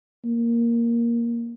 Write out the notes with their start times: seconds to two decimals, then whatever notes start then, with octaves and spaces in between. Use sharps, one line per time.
0.25 A#3